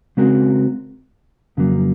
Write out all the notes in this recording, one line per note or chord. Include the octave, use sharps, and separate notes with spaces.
C#3 G#3 C4 F#4 A#4
F2 C#3 F#3 A#3